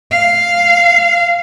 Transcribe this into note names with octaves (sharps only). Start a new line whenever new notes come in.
F5